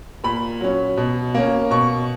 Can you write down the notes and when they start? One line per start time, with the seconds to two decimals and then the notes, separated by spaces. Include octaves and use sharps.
0.24 A#2 B5
0.60 F#3 C#4
0.97 B2
1.34 A#3 C#4
1.71 B2 C#6